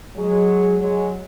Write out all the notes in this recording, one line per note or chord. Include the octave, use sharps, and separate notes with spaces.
F#3 G#3
F#3 G#3